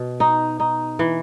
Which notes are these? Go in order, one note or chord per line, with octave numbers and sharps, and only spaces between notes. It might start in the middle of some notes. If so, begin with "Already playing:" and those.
Already playing: B2
D#4
D#4
E3